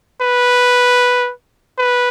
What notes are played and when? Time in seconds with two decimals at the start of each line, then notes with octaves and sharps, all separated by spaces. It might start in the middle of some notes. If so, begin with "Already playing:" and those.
0.21 B4
1.78 B4